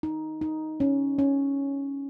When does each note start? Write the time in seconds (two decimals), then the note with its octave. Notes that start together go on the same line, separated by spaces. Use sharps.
0.03 D#4
0.41 D#4
0.80 C#4
1.19 C#4